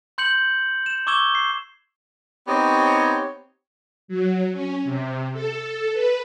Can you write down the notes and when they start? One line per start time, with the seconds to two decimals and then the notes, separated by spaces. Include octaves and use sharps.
0.18 C6 G6 C#7 F#7
0.86 E7
1.07 C#6 D6 E6 G#6 E7 G7
1.35 C7
2.47 B3 C4 D#4 G4 C#5
4.08 F#3
4.52 C#4
4.84 C3
5.33 A4
5.93 B4